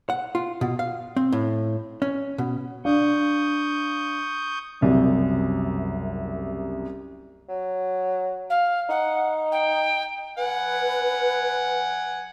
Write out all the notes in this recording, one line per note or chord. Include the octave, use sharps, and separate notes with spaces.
F#5
F4
B2
F5
C4
A2
C#4
B2
D4 F5 C#6 D#6 G6
F#1 C2 F#2 C3
F#3
F5
D#4 F#5
G5
B4 F#5 G#5